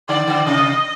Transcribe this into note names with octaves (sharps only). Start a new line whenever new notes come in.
D3 D5
D3
C3 D#5